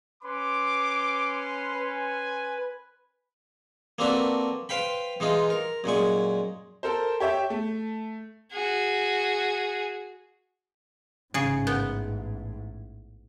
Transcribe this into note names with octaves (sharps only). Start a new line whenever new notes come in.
C#4 B4 C6 D6
B4 G#5
A#3 C4 D4 F#4 A4 B4
B4 C5 F5 G5 B5
E3 G#3 D#4 F4
A#4
F#2 A#2 G#3 C#6
A4 A#4 C5
G4 C#5 E5 G5
A3
F#4 G#4
A1 G#2 C#3 G#4
B3